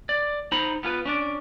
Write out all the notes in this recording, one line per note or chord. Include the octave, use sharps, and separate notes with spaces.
D5
D#4 C5 A#5 B5
B3 F4 G#4 B4
C#4 D4 D5